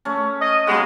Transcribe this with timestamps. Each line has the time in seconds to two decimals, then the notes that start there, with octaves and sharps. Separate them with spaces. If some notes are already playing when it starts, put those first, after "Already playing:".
0.05 A3 C#4
0.41 D#5
0.67 G#3 A#3 B3 F#4